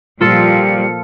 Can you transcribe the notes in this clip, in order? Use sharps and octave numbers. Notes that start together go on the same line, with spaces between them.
A#2 F3 G3 F4 A4 C#7